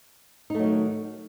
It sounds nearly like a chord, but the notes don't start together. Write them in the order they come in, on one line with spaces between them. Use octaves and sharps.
D#4 A3 F#3 D#3